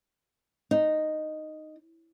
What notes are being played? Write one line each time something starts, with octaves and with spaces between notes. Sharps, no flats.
D#4